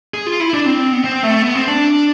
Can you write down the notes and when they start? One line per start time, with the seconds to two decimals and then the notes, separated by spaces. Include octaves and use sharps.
0.14 G#4
0.27 F4
0.40 E4
0.53 D4
0.66 C4
0.92 B3
1.04 C4
1.23 A3
1.42 B3
1.55 C4
1.68 D4